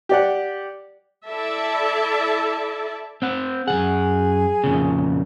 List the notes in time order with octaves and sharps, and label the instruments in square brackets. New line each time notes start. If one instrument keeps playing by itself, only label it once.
[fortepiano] G4 D5 F#5
[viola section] E4 A4 D5 E5 A5
[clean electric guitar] C4 F#5
[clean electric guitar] F#2 D#3 F#5 [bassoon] G#4
[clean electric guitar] F2 A#2 C#3